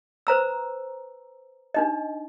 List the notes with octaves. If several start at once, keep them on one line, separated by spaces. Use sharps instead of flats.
B4 C5 A#5 E6
D4 D#4 D#5